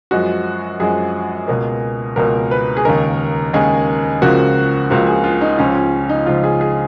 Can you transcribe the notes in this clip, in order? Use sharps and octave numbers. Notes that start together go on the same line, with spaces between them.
F#2 F3 G#3 F#4
F#2 F3 G#3 G#4
C#2 B2 A#3
C#2 B2 A#3 A#4
B4
G#4
D#2 C#3 G#3 A#4
D#2 C#3 G#3 G#4
C#2 C#3 F3 A#3 F#4
C#2 C#3 F3 A#3 F#4
G#4
F4
D#4
C#2 C#3 F3 C#4
C#4
D#4
C#2 C#3 F3 F4
G#4
G#4